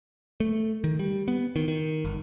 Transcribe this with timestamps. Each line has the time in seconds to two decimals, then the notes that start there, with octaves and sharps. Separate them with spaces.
0.40 A3
0.84 D#3
0.99 G3
1.28 B3
1.56 D#3
1.68 D#3
2.05 G1